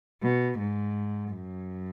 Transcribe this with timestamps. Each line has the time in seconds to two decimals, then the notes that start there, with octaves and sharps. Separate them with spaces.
0.22 B2
0.59 G#2
1.33 F#2